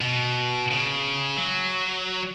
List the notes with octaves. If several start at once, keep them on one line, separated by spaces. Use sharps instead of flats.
B2
C#3
F#3